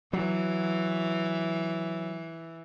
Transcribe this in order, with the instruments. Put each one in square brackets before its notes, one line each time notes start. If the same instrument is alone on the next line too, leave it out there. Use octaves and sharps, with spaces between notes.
[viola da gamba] E3 [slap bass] F#3